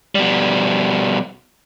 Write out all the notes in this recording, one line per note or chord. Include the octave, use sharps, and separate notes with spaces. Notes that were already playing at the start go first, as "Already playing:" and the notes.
B2 G3